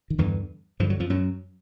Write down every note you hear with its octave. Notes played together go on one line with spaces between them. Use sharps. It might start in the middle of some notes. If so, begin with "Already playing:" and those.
D#3
E2 G2 D3 E3
G2 D3 F3
F#3
F2 F3
F#2 F#3